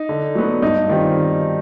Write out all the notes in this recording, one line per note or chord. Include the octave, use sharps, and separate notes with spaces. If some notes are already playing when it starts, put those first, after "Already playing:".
Already playing: D#4
D3
F#3 B3
G2 D#4
D#3 G3 C4 F4